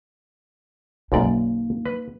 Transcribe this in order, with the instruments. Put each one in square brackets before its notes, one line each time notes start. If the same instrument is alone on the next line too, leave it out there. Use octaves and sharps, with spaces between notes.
[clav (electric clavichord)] B1 F#2 D5 [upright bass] A#3 D#4
[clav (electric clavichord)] B4